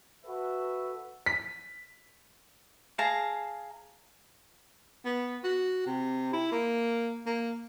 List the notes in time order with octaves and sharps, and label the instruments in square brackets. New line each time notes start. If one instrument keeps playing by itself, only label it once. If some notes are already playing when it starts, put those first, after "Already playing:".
[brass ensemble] F#4 A4 B4 E5
[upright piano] B6
[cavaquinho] G#4 F5 A5 A#5
[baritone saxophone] B3
F#4
C3
E4
A#3
A#3